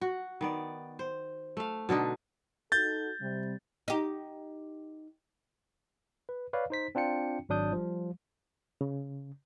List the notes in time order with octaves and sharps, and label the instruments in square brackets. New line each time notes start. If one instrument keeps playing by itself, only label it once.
[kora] F#4
D#3 B3 D5
C5
A3 F5
B2 D3 D4 D#4
[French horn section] D#4 F#4 A4 [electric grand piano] G6 A6
[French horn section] C3 G3
[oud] D#4 G4
[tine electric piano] B4
B4 C#5 D5 F5
D#4 C5 B6
C4 D4 F4 G5 C#7
G#1 F#3 D4 D#6 G6
F3 G3
[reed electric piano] C#3